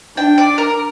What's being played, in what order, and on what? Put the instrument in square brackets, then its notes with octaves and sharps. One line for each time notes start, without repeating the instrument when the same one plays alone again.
[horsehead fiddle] D4 [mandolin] G5
[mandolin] D5
A#4